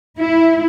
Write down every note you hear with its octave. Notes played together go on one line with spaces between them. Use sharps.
E4